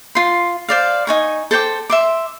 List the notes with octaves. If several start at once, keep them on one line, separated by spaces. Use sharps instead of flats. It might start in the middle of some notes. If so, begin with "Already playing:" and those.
F4 C6
C5 D5 F5
D#4 G#5 C#6
A4 C5 G5 D6
E5 C6 D6